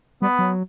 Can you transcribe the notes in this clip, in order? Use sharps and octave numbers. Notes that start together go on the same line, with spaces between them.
G3 B3
F#3